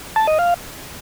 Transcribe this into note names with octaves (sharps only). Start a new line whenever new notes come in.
A5
D#5
F5